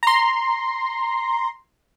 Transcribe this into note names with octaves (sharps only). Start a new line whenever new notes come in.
A#5 C6